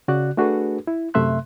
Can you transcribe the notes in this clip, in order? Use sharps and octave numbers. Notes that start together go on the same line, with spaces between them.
C#3 F#4 D5 F#6
A3 D4 F#4 G#4 A4 B4
E4
F#2 C3 A3 E5 C6 F#6